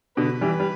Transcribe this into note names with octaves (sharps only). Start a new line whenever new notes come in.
B2 D3 B4
E3 G3
G3